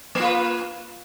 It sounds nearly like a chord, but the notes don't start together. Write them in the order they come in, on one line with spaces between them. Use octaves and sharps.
A#3 F4 B4